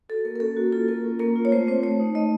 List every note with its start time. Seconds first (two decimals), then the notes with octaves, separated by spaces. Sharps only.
0.09 F#4 A4
0.25 A#3 A#4
0.36 A#4
0.40 C#4 A4
0.57 A#3 F#4
0.72 F4 A4
0.88 A#3 A#4
1.04 C#4
1.19 A#3 A#4
1.36 F4
1.45 C#5
1.51 A3 C5
1.67 C4 C5
1.83 A3 C#5
2.00 D#4
2.15 A3 D#5